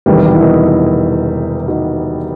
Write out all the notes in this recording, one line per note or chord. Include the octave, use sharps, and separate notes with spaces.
E1 E2 C3 D#3 G3 B3
G4
F#4
E4
B3 D#4
D#4 F#4